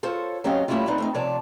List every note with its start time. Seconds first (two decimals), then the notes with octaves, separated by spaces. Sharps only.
0.03 F4 A4 C5 C#5
0.44 F#3 C4 C#4 G4 D#5 F5
0.68 G3 A3 A#3 C#4 E4 F4
0.86 A3 B3 C4 D4 D#4
0.98 A3 C4 D#4
1.14 C3 F3 C#5 D5 A5